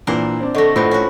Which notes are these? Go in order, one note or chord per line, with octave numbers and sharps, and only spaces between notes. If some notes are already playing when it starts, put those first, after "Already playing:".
A#2 E3 D4 A#4 C5 F#5
C4 D4
D3 A3 D#5 C#6 A#6
A2 B3 C4 F4 C5 B5
C#4 F#4